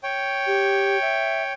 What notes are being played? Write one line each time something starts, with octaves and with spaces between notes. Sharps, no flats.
C#5 G5
G4
E5